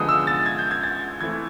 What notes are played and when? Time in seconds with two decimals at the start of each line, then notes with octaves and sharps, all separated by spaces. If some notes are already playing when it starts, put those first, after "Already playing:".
Already playing: D3 F3 G#3 B3 D#6
0.09 E6
0.27 A6
0.46 G#6
0.58 G6
0.71 G#6
0.83 A6
1.21 E3 A3 C4 G#6